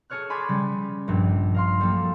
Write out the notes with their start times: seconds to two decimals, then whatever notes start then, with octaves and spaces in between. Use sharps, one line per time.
0.10 G#4 A4 C#5 F6 F#6
0.30 G#5 B5 C6 D6 G#6 A6
0.49 C#3 G3
1.08 A#1 G2
1.54 A#4 F5 C6
1.79 F#3 G3 A#3 A4